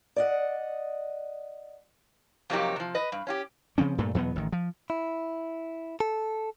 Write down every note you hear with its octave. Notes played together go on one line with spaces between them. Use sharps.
D5 D#5 F#5
F2 C3 F#3 A#3 D#4 G4
C3 F3
B4 D#5
G2
C#4 F4 G4
C#3 F3 C4 C#4
G2 A#2 A3
E2 B2 F#3 B3
A1 D#3
F3
E4
A4